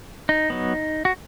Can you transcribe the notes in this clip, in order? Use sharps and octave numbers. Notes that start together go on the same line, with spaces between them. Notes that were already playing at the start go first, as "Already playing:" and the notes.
D#4
F#3 B3
F#4